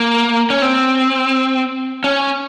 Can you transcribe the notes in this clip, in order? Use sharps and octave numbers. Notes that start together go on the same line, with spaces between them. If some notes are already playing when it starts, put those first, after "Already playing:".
Already playing: A#3
C#4
C4
C#4